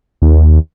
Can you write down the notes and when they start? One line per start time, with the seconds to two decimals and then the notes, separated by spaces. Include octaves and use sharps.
0.22 D#2